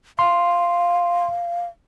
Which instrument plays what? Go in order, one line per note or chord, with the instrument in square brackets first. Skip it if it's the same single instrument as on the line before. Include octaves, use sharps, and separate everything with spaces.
[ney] F5 [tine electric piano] C6